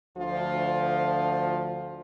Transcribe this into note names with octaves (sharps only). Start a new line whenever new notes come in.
D2 F3 F4